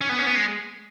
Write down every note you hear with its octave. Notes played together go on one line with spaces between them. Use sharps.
C#4
B3
C#4
B3
G#3